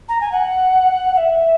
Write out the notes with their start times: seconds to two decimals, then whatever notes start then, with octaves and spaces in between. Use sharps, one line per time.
0.09 A#5
0.21 G#5
0.32 F#5
1.14 F#5
1.17 E5